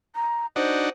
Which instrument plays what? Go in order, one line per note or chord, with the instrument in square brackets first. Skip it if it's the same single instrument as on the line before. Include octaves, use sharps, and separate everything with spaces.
[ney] A#5
[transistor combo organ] D4 D#4 F#4 [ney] C5